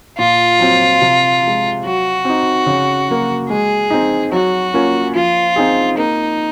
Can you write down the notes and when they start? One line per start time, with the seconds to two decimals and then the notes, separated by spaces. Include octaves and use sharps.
0.19 A#2 F4
0.59 F#3 C4
1.02 C3
1.42 F3
1.47 G#3
1.84 F#3 F#4
2.25 C4 D#4
2.66 C#3
3.09 F#3 A#3
3.49 G#3 G#4
3.90 C4 D#4
4.32 F#3 F#4
4.74 A#3 C#4 F4
5.15 F3 F4
5.56 C4 D#4 G#4
5.97 A#3 D#4